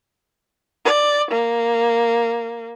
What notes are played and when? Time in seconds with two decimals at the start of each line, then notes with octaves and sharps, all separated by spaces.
0.85 D5
1.31 A#3